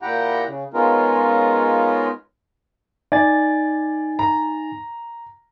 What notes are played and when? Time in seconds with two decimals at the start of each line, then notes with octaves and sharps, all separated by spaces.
0.02 A#2 E4 G4 F#5 G5 A#5
0.47 C#3
0.74 G#3 B3 C#4 D#4 F4 A#4
3.12 D#4 D5 G#5 A6
4.19 A#5